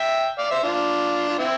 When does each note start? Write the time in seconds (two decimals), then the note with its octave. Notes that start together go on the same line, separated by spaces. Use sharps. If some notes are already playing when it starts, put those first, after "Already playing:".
Already playing: E5 G5
0.38 D5 F5
0.50 C5 E5
0.63 D4 F4
1.29 F4
1.39 C4 E4